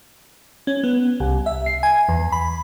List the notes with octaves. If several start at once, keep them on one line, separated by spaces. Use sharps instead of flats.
C#4
B3
C2
E5
C7
G#5
E2
B5